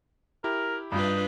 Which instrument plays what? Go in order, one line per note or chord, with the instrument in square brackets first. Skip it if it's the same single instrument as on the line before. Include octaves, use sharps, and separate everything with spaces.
[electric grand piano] E4 G4 [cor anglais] A#4
[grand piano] G2 [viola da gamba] D4 F4 B4 [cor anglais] D#4